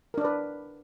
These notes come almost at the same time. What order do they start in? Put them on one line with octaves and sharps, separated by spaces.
A#4 D4 D5 B4